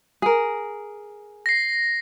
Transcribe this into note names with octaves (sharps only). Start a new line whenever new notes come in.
G#4 A#4
A#6 C7